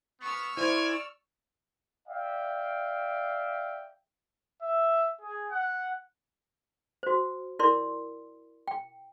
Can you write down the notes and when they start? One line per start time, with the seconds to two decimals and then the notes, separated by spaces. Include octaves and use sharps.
0.21 B3 C#6 E6 F6
0.57 E4 C5 D5 G#5
2.08 D5 E5 F5 G5
4.62 E5
5.21 G#4
5.51 F#5
7.03 F#4 C5
7.59 E4 A#4 D5 C6
8.68 G5